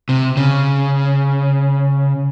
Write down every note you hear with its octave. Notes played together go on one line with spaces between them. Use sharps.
C3
C#3